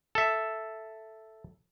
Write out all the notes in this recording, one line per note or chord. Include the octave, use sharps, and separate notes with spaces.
A4 E5